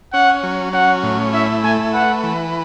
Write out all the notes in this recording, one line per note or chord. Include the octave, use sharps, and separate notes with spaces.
C#4 F#5
F#3
C#4 F#5
A2
E4 E5
A3 G#5
B4 F#5
E3